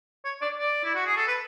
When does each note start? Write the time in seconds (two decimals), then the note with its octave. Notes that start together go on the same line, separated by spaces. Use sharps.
0.25 C#5
0.42 D5
0.59 D5
0.84 E4
0.95 F#4
1.06 G#4
1.17 A4
1.28 B4